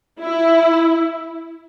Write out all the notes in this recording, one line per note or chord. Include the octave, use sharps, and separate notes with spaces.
E4